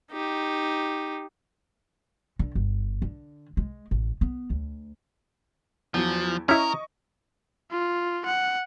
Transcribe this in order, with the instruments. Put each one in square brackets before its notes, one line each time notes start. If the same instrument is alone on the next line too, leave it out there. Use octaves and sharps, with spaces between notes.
[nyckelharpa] D#4 G4
[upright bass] D3
G1
D3
G#3
A1
B3
D2
[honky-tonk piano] E2 F#3 [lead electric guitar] F3
[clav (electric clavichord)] C#4 E4 [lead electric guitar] A#4 [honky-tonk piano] D#5 C#6 D#6
[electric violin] F4
F#5